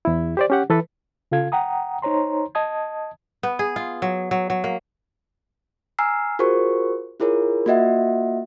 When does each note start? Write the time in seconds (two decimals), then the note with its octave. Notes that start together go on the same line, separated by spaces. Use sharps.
0.05 E2 E4
0.37 G4 C5 D5
0.50 C#4 G4 F#5
0.70 E3 A4 B4
1.32 C#3 F4 A4 F5 G#6
1.52 F#5 G5 A#5 D#6
2.02 D#4 C5 C#5 A#5 C6
2.55 D#5 A5 D#6 G#6
3.43 B3
3.59 G#4
3.76 F4
4.02 F#3
4.31 F#3
4.50 F#3
4.64 A#3
5.99 G#5 A#5 E6 F6 C7
6.39 F4 F#4 G#4 A#4 C5 C#6
7.20 E4 F4 G#4 A#4 C#5
7.66 A#3 F4 F#4 D#5 E5 F#5